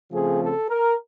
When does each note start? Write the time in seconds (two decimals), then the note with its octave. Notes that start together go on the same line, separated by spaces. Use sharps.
0.12 C#3 F3 A3 C4 G#4
0.42 A4
0.69 A#4